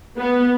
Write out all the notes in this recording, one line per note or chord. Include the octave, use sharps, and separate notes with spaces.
B3